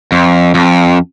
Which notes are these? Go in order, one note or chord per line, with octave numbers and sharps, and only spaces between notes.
F2
F2